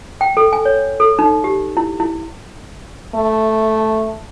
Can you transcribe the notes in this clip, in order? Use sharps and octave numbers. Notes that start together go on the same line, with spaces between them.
G5
A4
G#5
C#5
A4
D#4
G4
E4
E4
A3